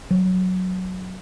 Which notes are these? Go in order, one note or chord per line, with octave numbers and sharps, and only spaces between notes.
F#3